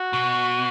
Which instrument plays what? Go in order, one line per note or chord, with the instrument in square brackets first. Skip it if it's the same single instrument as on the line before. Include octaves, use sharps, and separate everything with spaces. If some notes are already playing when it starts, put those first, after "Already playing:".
Already playing: [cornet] F#4
[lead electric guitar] B2